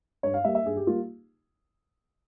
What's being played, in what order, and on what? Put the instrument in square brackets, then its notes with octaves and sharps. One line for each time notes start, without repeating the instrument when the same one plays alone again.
[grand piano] G2 C#5
F5
G3 A#3 E5
E5
G2 G#4
G4
G3 A#3 F4